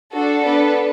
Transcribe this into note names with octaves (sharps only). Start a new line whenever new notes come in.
D4 F#4 A4
B3 D4 A4 B4